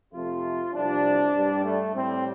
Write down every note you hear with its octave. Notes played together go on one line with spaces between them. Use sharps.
F2 C3 A3 F4
C2 C3 F3 D4
G2 G3
A3
A2 G3 C4